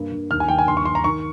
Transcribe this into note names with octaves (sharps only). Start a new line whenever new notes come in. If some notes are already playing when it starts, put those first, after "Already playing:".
Already playing: G2 A#3
G2
D#2 F6
G#5
D#2 G5
G#5
G2 C6
C#6
G2 C6
A#5
D#3 C#6